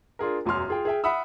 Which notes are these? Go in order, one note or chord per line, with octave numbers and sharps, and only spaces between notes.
D4 F4 G#4 A#4
E1 F#2 F#3 C6 F6
F4 G#4 G5
G#4 E5 G5
E5 F#5 B5 D#6 E6